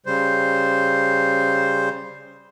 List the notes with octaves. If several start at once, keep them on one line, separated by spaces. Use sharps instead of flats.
C#3 G3 C5